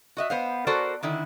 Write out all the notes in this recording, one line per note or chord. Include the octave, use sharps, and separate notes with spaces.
F#4 D#5 E5
B3 C5 F5
F#4 A4 A#4 C5 D5
D3 D#3 E4